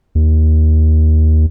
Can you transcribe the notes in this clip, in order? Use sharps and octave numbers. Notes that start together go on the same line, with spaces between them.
D#2